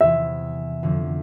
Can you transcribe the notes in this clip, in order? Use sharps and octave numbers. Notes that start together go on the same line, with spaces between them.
E2 C3 E3 E5
F2 D3 F3